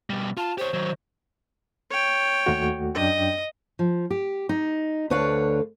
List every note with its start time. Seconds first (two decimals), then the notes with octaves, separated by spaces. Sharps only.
0.10 B2 G3
0.37 F4 A5
0.58 G4 C5 C#5
0.74 D#3 F#3
1.90 C#5 G5
2.46 D#2 A3 F#4
2.95 F#2 D4 D#5 G5
3.79 F3
4.11 G4
4.49 D#4
5.10 D2 D3 B4 C#5 D5 F5